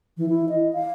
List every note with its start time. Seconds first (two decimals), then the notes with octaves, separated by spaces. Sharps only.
0.18 E3
0.29 E4
0.49 D#5
0.73 F5